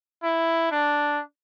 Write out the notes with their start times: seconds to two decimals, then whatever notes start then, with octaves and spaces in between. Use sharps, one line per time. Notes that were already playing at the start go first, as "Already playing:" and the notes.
0.23 E4
0.71 D4